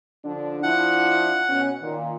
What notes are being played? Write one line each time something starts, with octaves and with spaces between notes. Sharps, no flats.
D3 F3 D4
F3 D4 E4 F#5
B2 C#4
A#2 D#3